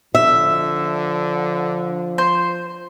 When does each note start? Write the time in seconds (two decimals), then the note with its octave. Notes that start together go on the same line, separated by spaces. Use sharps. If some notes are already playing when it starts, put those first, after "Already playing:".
0.15 D3 F3 E5
2.18 C5